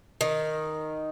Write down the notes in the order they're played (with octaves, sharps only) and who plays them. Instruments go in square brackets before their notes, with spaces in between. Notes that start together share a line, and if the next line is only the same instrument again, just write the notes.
[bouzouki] D#3